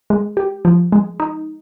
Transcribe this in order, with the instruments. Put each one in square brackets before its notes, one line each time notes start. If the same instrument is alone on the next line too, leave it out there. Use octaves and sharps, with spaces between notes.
[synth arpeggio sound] G#3
G4
F3
G#3
D#4